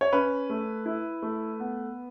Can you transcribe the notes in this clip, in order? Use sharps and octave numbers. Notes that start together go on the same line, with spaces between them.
C#5
C#4 B4
A3
E4
A3
B3